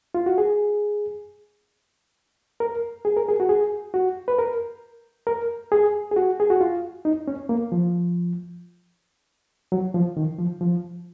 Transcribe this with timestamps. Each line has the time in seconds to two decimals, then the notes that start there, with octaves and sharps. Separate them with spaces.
0.15 F4
0.26 F#4
0.38 G#4
2.60 A#4
3.05 G#4
3.17 A#4
3.29 G#4
3.40 F#4
3.49 G#4
3.94 F#4
4.28 B4
4.38 A#4
5.27 A#4
5.72 G#4
6.11 G#4
6.16 F#4
6.40 G#4
6.50 F#4
6.61 F4
7.05 D#4
7.28 C#4
7.49 A#3
7.72 F3
9.72 F#3
9.94 F3
10.17 D#3
10.38 F3
10.61 F3